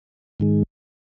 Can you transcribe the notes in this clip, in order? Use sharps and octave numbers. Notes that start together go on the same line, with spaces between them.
G#2 D#3 G#3